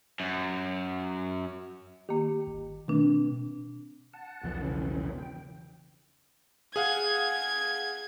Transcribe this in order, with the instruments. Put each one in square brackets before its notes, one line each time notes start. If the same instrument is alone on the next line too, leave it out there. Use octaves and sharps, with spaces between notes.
[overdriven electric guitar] F#2
[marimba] D#3 A#3 [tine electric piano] G4
[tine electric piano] G1
[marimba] B2 D4 [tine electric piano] D#3 A3 C4
[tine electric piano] C4
[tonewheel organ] F#5 A5
[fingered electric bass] B1 E2 F3
[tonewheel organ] C#3 E3 C#4
G5
[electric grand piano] G#4 F5 F#5 [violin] G#6